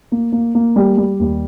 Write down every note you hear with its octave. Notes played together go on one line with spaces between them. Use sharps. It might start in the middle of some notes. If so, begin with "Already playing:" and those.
A#3
A#3
A#3
G3
G3
D#2